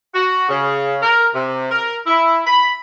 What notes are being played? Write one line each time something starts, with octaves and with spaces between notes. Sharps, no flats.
F#4
C#3
A#4
C3
A#4
E4
B5